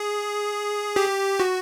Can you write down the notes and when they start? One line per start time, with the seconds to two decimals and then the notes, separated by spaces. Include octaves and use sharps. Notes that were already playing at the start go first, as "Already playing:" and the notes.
Already playing: G#4
0.96 G4
1.40 F#4